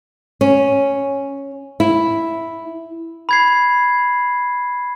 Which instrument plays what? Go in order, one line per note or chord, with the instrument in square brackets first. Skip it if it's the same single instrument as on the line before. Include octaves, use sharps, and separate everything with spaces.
[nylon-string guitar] C#4
E4
[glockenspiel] B5 G#6 C7